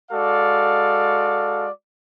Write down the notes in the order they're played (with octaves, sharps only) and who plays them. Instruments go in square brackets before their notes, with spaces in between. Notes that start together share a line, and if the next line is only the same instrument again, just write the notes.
[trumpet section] G#3 F#4 A4 D5 F5